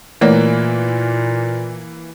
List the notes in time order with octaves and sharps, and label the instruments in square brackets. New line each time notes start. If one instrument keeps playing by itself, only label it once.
[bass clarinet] A#2 [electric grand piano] E3 A#3 [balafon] A3 C#5 D5